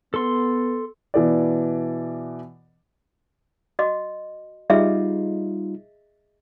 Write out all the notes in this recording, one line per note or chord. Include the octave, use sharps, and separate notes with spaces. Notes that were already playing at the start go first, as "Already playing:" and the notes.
B3 A4 C6
B2 E3 D5
F#4 D#5 D6
G3 D#4 F4 G#4 D#5 E5